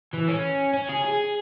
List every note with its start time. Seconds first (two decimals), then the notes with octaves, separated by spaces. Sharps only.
0.13 E3
0.28 C#4
0.74 C#4
0.89 G#4
1.05 G#4